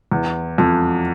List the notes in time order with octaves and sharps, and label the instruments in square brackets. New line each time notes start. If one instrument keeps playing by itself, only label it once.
[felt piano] E2
F2